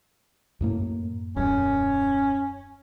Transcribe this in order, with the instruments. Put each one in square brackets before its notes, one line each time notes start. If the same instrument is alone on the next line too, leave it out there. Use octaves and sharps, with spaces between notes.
[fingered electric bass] F#2 A2 A#3
[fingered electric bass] D#1 F#2 [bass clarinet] C#4